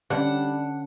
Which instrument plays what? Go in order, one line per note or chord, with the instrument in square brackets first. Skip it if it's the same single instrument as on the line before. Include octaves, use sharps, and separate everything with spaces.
[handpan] D3 C#4 [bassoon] G3 [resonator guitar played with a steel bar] D4 [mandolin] F#5